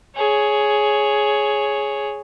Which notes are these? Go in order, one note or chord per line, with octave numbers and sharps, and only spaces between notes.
G#4 C#5